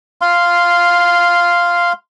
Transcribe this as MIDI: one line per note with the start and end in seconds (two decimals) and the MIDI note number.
0.21 1.93 77
0.21 1.93 84